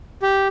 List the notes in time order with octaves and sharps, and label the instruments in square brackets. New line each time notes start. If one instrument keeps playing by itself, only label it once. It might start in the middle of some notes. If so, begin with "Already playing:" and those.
[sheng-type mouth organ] G4